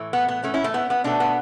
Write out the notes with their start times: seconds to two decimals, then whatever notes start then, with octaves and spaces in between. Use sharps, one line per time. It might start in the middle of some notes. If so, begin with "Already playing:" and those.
Already playing: A2 E3 A3
0.13 B3
0.28 B3
0.43 A3 C#4
0.54 C#4 E4
0.64 A3
0.74 B3
0.90 B3
1.04 B2 A3 B3 D4
1.20 B3